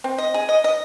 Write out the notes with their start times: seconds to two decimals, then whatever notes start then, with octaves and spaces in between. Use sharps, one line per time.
0.04 C4
0.18 D#5
0.34 G#4
0.49 D#5
0.64 D#5